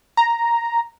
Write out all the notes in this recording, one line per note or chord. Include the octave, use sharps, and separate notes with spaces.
A#5